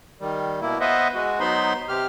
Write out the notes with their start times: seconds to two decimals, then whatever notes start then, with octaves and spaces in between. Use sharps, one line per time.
0.20 D#3 G3
0.61 B2 A#3 E4
0.81 B3 B4 C5 D#5 E5 F#5
1.14 G#3 F#4
1.40 F#3 B3 D#4 C5 B5 C6
1.89 C3 G4 F6